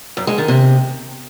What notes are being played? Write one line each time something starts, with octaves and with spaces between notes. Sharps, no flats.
F#2
G#3
D#3
C3